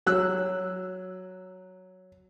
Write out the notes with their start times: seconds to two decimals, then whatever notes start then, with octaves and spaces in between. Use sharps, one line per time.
0.06 F#3 E6 F#6